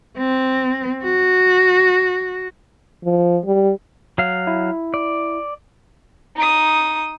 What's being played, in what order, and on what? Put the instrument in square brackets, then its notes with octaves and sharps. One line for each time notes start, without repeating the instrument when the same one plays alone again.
[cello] C4
F#4
[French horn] F3
G3
[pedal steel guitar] F#3 F5
[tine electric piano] E4
[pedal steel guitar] D5
[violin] D#4 D#6